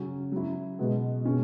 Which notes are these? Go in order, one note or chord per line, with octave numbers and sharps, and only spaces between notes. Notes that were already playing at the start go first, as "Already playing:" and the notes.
Already playing: C#3 F#3 C#4 F#4
F#3 E4
B2 G#3 B3 F#4
B2 G#3 C#4